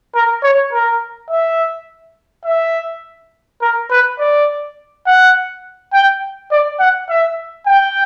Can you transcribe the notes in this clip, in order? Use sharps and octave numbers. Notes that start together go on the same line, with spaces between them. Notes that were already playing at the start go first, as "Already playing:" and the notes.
A#4
C#5
A#4
E5
E5
A#4
B4
D5
F#5
G5
D5
F#5
E5
G5